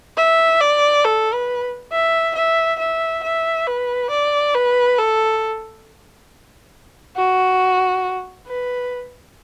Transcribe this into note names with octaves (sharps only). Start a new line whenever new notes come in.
E5
D5
A4
B4
E5
E5
E5
E5
B4
D5
B4
A4
F#4
B4